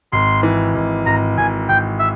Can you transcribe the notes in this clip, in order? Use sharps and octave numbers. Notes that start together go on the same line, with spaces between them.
G#1 C6
E3
G#1
G#1 A#5
G#1 G#5
G#1 G5
E5